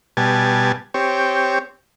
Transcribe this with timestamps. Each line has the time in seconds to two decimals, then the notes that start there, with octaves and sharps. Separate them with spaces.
0.17 B2 G3 G#5 A5
0.94 C4 G4 C#5